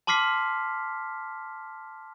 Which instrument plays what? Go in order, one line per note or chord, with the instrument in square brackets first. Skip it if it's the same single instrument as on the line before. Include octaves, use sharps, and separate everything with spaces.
[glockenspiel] A5 C6 D6 F6 B6 C7